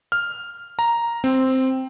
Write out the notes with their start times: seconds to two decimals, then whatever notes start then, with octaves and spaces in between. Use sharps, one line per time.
0.12 F6
0.79 A#5
1.24 C4